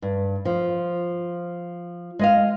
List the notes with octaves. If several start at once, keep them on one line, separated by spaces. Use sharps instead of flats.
G2
F3
G#3 D#5 F5